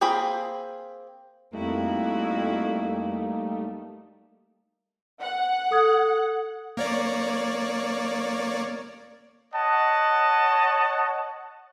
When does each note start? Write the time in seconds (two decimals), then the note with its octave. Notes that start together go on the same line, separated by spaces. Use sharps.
0.01 A#3 C4 G#4 G5 B5
1.53 F2 G3 A3 A#3 D#4 E4 F#4
5.22 F#5
5.71 A4 D#6 G#6
6.77 A#3 C#5 D5
9.53 C#5 D#5 F#5 A5